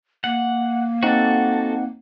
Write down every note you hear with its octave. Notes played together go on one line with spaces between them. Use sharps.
A#3 F#5
C4 D#4 F#4 A4 F#5